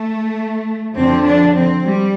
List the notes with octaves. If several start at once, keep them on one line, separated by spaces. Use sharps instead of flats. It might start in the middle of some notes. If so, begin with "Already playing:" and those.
Already playing: A3
F2 D3 F3 C4
D4
C4
G3